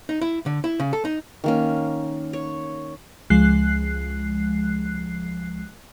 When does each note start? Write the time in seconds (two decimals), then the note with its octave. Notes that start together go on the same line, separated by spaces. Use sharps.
0.09 D#4
0.21 E4
0.46 D3
0.64 E4
0.80 C#3
0.93 A4
1.05 D#4
1.44 D#3 A#3 C#4
2.33 C#5
3.30 C#2 F3 G#3 F#6 C7